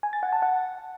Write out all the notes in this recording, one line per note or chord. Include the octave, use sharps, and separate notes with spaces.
G#5
A6
F#5
A5
F#5